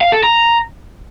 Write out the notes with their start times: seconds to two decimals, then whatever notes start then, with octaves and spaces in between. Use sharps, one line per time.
0.01 F5
0.12 A4
0.23 A#5